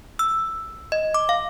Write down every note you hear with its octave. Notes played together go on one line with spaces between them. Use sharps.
E6
D#5
D6
F5